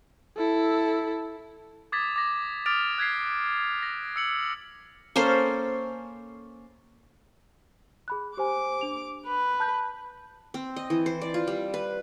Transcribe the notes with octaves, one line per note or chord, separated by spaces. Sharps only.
E4 A4
D6 D#6 G#6 A6 B6
D6 A#6
D6 D#6 F6 A6 D7 F7
F#6 G#6 B6 C7
A#6
E6 C#7 F#7
A#3 C#4 A4 C5
G#4 B5 F#6
G4 C5 G#5 D6
D4 F7
B4
A5 F#6 G6
C4
D#5
E3
C5
D5
F4
G3
B4